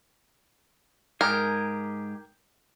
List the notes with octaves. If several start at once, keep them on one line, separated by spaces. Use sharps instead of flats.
G#2 G4 G#4 A#4